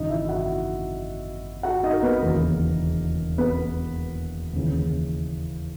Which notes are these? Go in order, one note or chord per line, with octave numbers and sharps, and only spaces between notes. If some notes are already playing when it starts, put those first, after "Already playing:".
Already playing: G#1 F#2 C#3 E3 D#4 D#5
E4 E5
F#4 F#5
F#4 F#5
D#4 D#5
A#4
B3 B4
E1 D#2 C#3 E3 A#3 A#4
B3 B4
D#2 C#3 E3